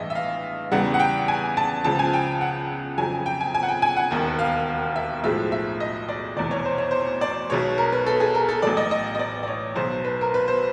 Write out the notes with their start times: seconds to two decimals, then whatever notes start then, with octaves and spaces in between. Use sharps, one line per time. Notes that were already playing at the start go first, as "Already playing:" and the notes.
Already playing: A1 G2 E3 G#3 D#5 E5
0.10 E5
0.15 F5
0.71 E2 C#3 E3 G3 F#5
0.94 F#5
1.00 G5
1.28 G#5
1.57 A5
1.84 C#2 C#3 F3 A5
1.99 G#5
2.13 G5
2.41 F#5
2.98 F2 C#3 F#3 G#5
3.26 G5
3.41 G#5
3.54 G#5
3.63 F#5
3.69 G5
3.82 G#5
3.97 F#5
4.11 E1 D#2 D#3
4.39 F5
4.96 E5
5.24 B1 A2 F3 G#3 E5
5.52 E5
5.80 D#5
6.09 D5
6.36 F1 E2 B2 D5
6.51 C#5
6.65 C5
6.78 C#5
6.91 C5
7.21 D5
7.50 B1 B2 G#3 C#5
7.78 A#4
7.93 B4
8.06 A4
8.20 G#4
8.35 A#4
8.49 A4
8.62 A1 A2 F#3 D5
8.77 D#5
8.91 D#5
9.15 D#5
9.19 D5
9.43 D5
9.48 C#5
9.76 B1 B2 F#3 C5
10.04 B4
10.21 A#4
10.34 B4
10.48 C5